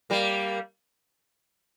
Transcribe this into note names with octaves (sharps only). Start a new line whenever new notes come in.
G3 A#3